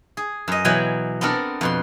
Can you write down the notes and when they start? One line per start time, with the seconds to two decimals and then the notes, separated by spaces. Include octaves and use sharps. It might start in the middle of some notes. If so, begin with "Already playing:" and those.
0.17 G#4
0.48 F#2 D#5
0.65 B2 E3 F#3 G5 G#5 B5
1.21 B3 C4 D4 A4 A#4
1.61 F2 B2 C6